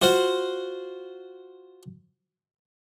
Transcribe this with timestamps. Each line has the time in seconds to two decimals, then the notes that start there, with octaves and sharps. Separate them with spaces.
0.02 F4 F#4 C5 F5 F#5